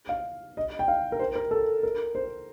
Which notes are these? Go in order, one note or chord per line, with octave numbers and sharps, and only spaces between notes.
F5
D#5
G5
F5
A#4
C5
A#4
A4
A#4
C5